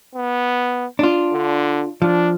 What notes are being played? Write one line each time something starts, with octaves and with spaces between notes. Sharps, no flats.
B3
D4 F4
D3
F3 D4